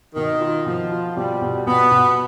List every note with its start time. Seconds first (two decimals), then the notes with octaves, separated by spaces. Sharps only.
0.15 B2 D#3
0.41 F4
0.66 B2 F3
0.92 F4
1.16 B2 G3
1.42 B2
1.67 B2 B3
1.92 B2